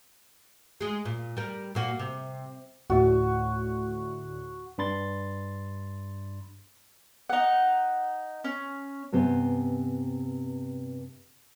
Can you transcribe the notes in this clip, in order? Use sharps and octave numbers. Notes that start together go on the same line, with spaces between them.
G#3 G#4
A#2
G3 A#4
A#2 A#3 F#4
C3
D2 A2 F#4
G2 D4 B5 C6 A6
D#4 F#5
C#4
G2 C3 B3 C5 G#5